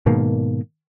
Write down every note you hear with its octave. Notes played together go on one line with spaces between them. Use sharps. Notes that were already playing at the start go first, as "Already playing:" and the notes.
G#2 B2 D#3 A#3